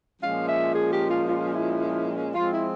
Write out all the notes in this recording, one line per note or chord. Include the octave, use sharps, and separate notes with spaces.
A#2 F3 G#3 C#4 F5
E5
G#4
G4
F4
F4
E4
F3 G#3 C4 F4
E4